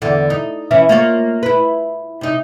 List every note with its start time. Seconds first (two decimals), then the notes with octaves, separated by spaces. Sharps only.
0.02 E2 D3
0.30 D#4
0.71 E3 C#4 E4
0.89 A#3 F4 C#5
1.43 E4 B4
2.21 C3 D#4